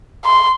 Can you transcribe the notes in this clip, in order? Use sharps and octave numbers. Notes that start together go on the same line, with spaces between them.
C6